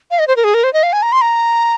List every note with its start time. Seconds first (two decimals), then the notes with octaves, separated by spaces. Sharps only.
0.11 F5
0.19 D#5
0.27 C5
0.36 A#4
0.44 G#4
0.54 A#4
0.64 C5
0.73 D#5
0.83 F5
0.93 G#5
1.02 A#5
1.12 C6
1.21 A#5